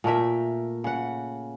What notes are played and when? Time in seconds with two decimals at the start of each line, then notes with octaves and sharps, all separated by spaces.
0.04 A#2 A3 A#4 E5
0.84 C#3 F#5